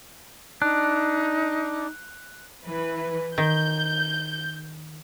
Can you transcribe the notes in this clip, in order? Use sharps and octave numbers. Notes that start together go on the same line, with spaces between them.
D4 D#4 F#6
E3 B4
D#3 G6